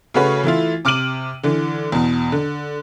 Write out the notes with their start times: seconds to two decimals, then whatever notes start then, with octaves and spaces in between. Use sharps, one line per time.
0.14 C#3 A3 C#4 F#4 B4 C#5
0.44 E3 A3 E4 F4
0.85 C3 D6 F6 D7 D#7 F#7
1.43 D3 E3
1.92 E2 B2
2.32 D3